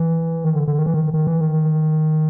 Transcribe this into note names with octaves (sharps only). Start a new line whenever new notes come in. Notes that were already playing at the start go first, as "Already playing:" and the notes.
Already playing: E3
D#3
D3
D3
D#3
E3
D#3
D#3
E3
D#3